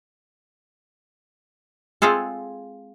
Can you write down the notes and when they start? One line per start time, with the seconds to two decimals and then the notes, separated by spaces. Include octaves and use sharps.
2.02 G#3 C4 F4 G#4 A4